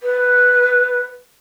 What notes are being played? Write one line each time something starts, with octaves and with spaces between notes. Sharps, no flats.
B4